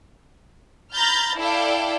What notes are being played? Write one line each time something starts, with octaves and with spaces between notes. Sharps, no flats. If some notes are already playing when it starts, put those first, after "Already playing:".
A#5 B5 F6 G6 A6
E4 A4 D5 F5 G5